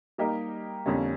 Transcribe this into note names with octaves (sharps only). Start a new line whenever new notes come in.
G3 A#3 D#4 G4 A#4
F2 D3 G3 A#3 C#4